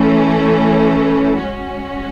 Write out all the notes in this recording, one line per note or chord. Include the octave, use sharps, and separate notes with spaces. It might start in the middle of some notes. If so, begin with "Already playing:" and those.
Already playing: E3 A3 C#4
G#3 C#4 F#4